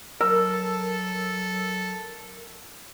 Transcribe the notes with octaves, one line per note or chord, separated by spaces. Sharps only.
F#3 A4 A#4 E6